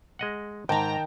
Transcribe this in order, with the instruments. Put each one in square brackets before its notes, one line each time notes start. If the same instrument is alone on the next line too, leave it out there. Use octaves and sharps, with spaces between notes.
[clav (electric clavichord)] G#3 D#5 F#5
[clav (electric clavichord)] G#2 [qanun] D#3 D#4 [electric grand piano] G5 A5 [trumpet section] A#5